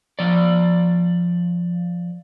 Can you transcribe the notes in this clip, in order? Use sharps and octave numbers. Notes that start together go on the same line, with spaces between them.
F3 D5